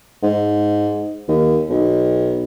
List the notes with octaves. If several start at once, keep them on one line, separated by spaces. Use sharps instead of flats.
G#2
D#2
B1